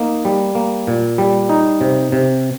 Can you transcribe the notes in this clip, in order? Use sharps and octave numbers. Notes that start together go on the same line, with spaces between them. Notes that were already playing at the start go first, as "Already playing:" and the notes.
Already playing: A#3 D#4
G3
A#3
A#2
G3
D#4
C3
C3